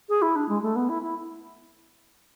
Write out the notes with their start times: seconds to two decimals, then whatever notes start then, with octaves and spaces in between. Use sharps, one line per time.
0.09 G#4
0.22 E4
0.36 D4
0.49 G#3
0.62 A3
0.75 B3
0.89 E4
1.02 E4